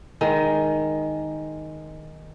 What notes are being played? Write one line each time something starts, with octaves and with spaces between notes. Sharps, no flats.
D#3 G#3